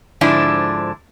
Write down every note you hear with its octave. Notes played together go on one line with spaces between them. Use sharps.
G#2 D3 F3 D4 E4